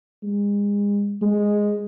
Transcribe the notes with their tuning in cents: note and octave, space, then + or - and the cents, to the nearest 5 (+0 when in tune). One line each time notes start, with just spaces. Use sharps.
G#3 -35
G#3 -5